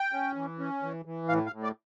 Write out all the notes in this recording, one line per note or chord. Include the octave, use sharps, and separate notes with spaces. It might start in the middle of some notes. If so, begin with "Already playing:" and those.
Already playing: G5
C#4
E3
C#4
E3
E3
A2 F5
F5
A2
D5